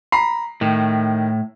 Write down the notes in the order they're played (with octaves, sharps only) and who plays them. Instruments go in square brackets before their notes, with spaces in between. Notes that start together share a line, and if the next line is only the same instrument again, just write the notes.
[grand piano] A#5 B5 C7
[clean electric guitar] A2 [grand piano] D#3